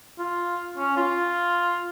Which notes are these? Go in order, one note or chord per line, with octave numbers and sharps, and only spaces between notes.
F4
C#4
F4